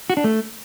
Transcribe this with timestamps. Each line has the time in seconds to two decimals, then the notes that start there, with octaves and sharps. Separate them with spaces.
0.10 F#4
0.17 D4
0.24 A3